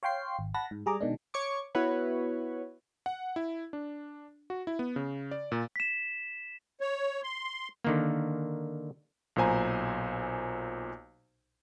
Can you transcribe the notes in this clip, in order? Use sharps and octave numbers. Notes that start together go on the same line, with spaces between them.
C#5 F5 G5 C6 C7
G#1
F#5 A5 B5 A#6
G#2
G3 G#4 A#5 D6
B2 D#3 G#3 D4
C#5 C#6 D6
B3 E4 F#4 B4 C#5
F#5
E4
D4
F#4
E4
B3
C#3
D5
A#2
B6 E7
C#5
C6
D3 D#3 A#3
B1 A#2 C5 G#5 A#5